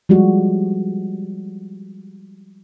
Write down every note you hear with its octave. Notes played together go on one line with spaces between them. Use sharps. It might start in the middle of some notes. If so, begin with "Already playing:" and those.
F3 G3 G#3 F#4